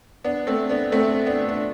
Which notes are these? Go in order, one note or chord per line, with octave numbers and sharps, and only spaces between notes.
B3 D4
A3 C4
B3 D4
A3 C4
B3 D4
D4